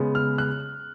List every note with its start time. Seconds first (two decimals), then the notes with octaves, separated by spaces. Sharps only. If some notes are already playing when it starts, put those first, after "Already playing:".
Already playing: C#3 G#3 B3
0.15 F6
0.38 F#6